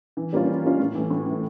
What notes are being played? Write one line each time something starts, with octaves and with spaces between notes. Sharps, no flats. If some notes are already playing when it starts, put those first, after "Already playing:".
E3
G3 A#3 C#4 F4
E3
G3 A#3 C#4 F4
A2
E3 A3
A2
E3 A3